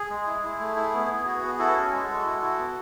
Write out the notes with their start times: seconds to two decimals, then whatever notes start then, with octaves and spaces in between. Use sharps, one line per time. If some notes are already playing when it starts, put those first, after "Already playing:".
Already playing: G#4
0.10 G#3
0.27 E4
0.43 E4
0.60 A3
0.76 E4
0.93 B3
1.10 B3
1.26 F#4
1.43 B3
1.59 E4 F#4 A4
1.76 C#4
1.92 G#3
2.09 G#3
2.25 E4
2.42 E4
2.59 B3